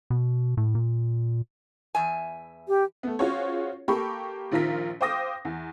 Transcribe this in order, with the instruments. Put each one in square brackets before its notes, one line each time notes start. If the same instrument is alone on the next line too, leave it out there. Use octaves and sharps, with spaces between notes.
[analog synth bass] B2
A2
A#2
[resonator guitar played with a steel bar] E2 E5 G#5
[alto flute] G4
[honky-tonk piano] A3 B3
C#4 F4 F#4 G#4 C5 C#5
A#3 G4 A4 B5 C#6
A#1 D#3 F3 F4 A#4 B6
C5 F5 G5 D6 D#6 A#6
E2